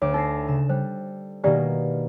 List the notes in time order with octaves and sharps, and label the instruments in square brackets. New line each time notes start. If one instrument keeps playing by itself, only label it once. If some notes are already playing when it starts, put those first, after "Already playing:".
[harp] D2 D6 [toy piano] C#5
[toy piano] D#4 [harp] A4 A#6 C7
[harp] C#3 E7
[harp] G3 [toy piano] C5
[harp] B2 D#3 A#3 [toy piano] D4 G4 D5